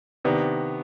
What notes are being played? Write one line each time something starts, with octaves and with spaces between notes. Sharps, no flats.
C3 D#3 B3 D4